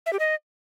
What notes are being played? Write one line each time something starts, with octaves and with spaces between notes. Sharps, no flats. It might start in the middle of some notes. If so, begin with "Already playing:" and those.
E5
G4
D#5